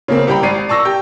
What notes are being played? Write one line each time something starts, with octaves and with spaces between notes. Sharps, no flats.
C#3 A#3 C4
C2 G4 G5 A#5 B5
G#1 D5 C7 D#7
D5 A5 C#6 E6 A#6
G4 G5